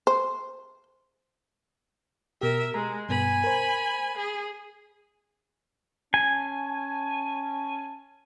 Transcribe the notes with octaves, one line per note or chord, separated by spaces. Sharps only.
C5
B2 G4 A#4 E5
G#3 A#5
G2 B2 B3 G#5 B5
A#4 C5
G#4
C#4 G#5 A5